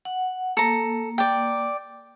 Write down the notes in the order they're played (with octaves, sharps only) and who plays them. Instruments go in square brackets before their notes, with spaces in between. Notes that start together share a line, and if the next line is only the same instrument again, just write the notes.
[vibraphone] F#5
[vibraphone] A#3 [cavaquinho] A4 A#5
[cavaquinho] D5 G5